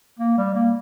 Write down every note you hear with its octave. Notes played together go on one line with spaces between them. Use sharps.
A#3
G3
A#3